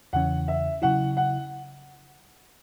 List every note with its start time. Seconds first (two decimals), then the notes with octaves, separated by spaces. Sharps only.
0.13 E2 C#3 E3 C#4 F#5
0.48 E5
0.82 C#3 F#3 E4 F#5
1.17 F#5